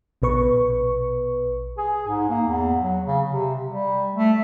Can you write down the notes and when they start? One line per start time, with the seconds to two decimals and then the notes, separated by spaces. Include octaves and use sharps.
0.22 A#1 B2 B4 C#6
1.78 G#4
2.08 G#2
2.30 A#3
2.48 E2
2.81 F#3
3.05 C#3
3.29 C3
3.68 G3
4.14 A3